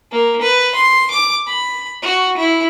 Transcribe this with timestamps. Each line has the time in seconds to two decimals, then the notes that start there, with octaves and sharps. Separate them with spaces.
0.11 A#3
0.41 B4
0.75 C6
1.11 D6
1.46 B5
2.02 F#4
2.37 E4